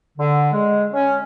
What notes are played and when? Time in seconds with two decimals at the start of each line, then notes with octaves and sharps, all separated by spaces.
0.18 D3
0.52 G#3
0.93 C#4